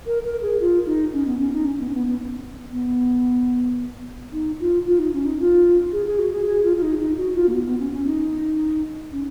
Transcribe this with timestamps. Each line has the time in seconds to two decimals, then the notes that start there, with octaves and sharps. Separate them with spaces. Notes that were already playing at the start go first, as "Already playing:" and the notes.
0.06 A#4
0.24 A#4
0.42 G#4
0.60 F4
0.86 D#4
1.13 C#4
1.26 B3
1.39 C#4
1.53 D#4
1.66 C#4
1.80 B3
1.89 C#4
1.93 B3
2.07 B3
2.72 B3
4.33 D#4
4.60 F4
4.86 F4
4.99 D#4
5.13 C#4
5.25 D#4
5.40 F4
5.92 G#4
6.06 G#4
6.19 F#4
6.32 G#4
6.46 G#4
6.63 F4
6.76 F4
6.82 D#4
6.99 D#4
7.17 F#4
7.35 F4
7.48 A#3
7.53 B3
7.66 B3
7.79 C#4
7.92 C#4
8.06 D#4
9.12 C#4